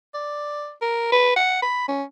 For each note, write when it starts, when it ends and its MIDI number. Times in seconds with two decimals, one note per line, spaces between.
0.14 0.72 74
0.82 1.09 70
1.12 1.35 71
1.36 1.58 78
1.62 1.88 83
1.88 2.03 61